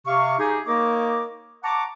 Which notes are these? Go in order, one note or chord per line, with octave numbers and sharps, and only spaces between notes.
C3 F5 C#6
D#4 G4 G#4
A#3 D#4 A#4 C#5 D#5 D6
F#5 A5 A#5 C#6 D6